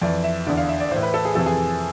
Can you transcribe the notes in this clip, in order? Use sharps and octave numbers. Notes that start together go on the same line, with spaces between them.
F2 E3 D5
E5
E2 D3 D5
F5
E5
D5
A2 E3 C5
B4
A4
G#4
F2 C3 E3 A4
G#4